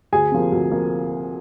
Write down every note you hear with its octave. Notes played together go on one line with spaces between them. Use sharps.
D2 G#4 G#5
C3 F3 A#3
D2
F3 A#3